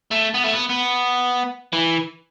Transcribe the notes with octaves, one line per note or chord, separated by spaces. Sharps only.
A3
B3
A3
B3
B3
E3